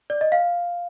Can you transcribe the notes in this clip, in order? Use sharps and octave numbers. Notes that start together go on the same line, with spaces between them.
D5
D#5
F5